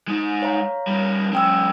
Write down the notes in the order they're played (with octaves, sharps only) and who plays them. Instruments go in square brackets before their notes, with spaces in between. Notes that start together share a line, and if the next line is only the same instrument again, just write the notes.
[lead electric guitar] G#3 D#4
[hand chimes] C#5 F5 A#5
[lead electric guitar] G3 C#4
[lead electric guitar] F#3 G#3 [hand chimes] C#4 G5 E6